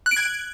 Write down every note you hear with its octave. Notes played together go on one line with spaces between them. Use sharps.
F#6
D7
G#6